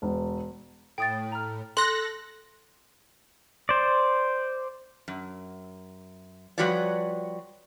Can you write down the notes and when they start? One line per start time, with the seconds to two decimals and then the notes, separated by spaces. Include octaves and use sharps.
0.02 E1
0.98 A2 G5 D#6 A6
1.32 A#5 F6
1.77 A4 C6 F#6 A#6 G7
3.69 C5 D5
5.08 F#2
6.58 F3 G3 F#4 B4 C#5 D5